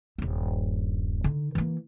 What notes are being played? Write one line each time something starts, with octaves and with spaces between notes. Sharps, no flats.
D#1 G2
D3 D#4
E3 A#3